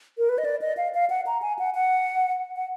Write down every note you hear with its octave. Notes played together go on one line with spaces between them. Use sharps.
A#4
B4
D#5
D5
D#5
F5
F5
F#5
A#5
G#5
F#5
F#5
F#5